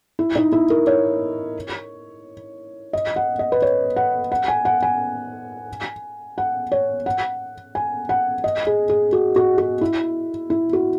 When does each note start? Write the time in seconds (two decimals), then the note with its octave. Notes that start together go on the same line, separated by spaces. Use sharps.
0.19 E4
0.36 D#4
0.52 E4
0.70 A#4
0.87 C#5
2.93 D#5
3.16 F#5
3.39 D#5
3.52 B4
3.62 C#5
3.96 F#5
4.32 F#5
4.48 G#5
4.65 F#5
4.83 G#5
6.38 F#5
6.72 C#5
7.06 F#5
7.75 G#5
8.09 F#5
8.44 D#5
8.67 G#4
8.89 G#4
9.13 F#4
9.36 F#4
9.58 F#4
9.81 E4
10.50 E4
10.73 F#4